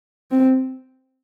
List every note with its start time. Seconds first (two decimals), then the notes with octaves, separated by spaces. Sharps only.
0.31 C4